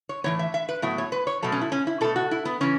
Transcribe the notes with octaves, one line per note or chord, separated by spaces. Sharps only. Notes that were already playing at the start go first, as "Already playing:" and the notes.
C#5
A2 E3 B3 C#5
E5
E5
B4
A2 F#3 B3 E5
C#5
B4
C#5
B2 F#3 A3 A4
C#4
E4
C#4
E4
B2 A3 A4
F#4
E4
B3
C#3 E3 C#4